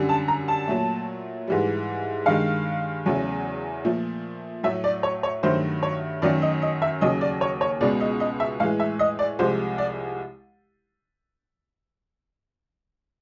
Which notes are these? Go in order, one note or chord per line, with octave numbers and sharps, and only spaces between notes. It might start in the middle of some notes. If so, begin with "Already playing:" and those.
Already playing: F#2 D3 G3
A5
A#5
A5
A#2 F#3 A3
G#2 E3 G3
G2 D#3 G#3 F5
E2 C#3 F#3 A3
A#2 F3 A3
A2 F#3 A3 E5
D5
C#5
C#5
G2 D#3 F#3 A3 C5
C#5
F#2 D#3 F#3 A3 D5
D#5
D#5
E5
D#2 C#3 F#3 D#5
D5
C#5
C#5
C#2 B2 G#3 D5
D#5
D#5
E5
A2 E3 G#3 F5
E5
D#5
D5
C2 C3 F3 G#3 C5
D5